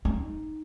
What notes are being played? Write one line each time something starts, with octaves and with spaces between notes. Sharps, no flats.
D#4